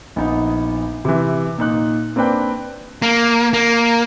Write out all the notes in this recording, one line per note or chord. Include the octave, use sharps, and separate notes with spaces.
A#1 B3 D#4
C3 E3
A#2 D#4 F#6
A#3 C4 D4 B4 G5
A#3
A#3